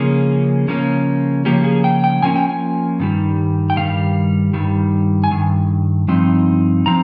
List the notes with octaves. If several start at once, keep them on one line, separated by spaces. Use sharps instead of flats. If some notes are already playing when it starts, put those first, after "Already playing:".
Already playing: C#3 F3 A#3 C#4 G#4
C#3 F3 A#3 C#4
C#3 F3 A#3 C#4 G4
G#4
G5
G5
C#3 F3 A#3 C#4 G#5
G5
G#5
G2 D#3 G3
G5
G2 D#3 G3 F5
G2 D#3 G3
G#5
G2 D#3
G2 F3 C4 D#4
F3 C4 A#5